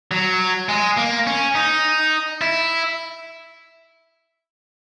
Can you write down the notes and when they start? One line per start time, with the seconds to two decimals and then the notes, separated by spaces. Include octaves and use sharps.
0.11 F#3
0.69 G#3
0.97 A#3
1.27 C#4
1.55 D#4
2.41 E4